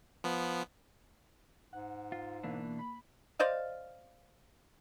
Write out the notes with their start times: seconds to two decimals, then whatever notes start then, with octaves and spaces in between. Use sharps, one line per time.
0.24 F3 B3
1.73 G#2 F#5
2.12 F4
2.43 B2 E3 A#3 D4
2.79 B5
3.39 C5 D5 D#5 F5